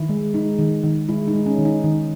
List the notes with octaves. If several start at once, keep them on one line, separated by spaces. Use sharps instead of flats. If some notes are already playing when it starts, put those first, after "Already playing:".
Already playing: D#3 E4
G#3
G#3 D#4
D#3
D#3
G#3 E4
D#4
G#3
C#4
D#3
D#4
D#3